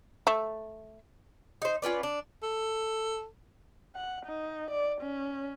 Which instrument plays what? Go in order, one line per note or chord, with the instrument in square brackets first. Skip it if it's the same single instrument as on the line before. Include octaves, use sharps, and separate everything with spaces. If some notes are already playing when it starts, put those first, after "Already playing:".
[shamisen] A3
[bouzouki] D#4 C5
C#4 F4 B4 D5
D4
[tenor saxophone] A4
[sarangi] F#5
D#4
D5
C#4